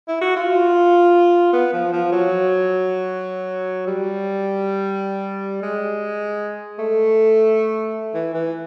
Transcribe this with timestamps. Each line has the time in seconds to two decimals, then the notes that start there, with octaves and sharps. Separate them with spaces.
0.08 E4
0.22 F#4
0.36 F4
1.53 B3
1.73 F3
1.93 F3
2.12 F#3
3.87 G3
5.62 G#3
6.79 A3
8.14 E3
8.34 E3